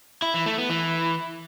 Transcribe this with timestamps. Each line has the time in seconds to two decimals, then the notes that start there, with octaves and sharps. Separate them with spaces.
0.22 E4
0.34 E3
0.46 A3
0.58 B3
0.70 E3